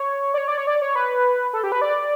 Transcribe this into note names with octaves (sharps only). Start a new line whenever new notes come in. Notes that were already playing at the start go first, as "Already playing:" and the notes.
Already playing: C#5
D5
C#5
D5
C#5
D5
C#5
B4
A4
G4
B4
D5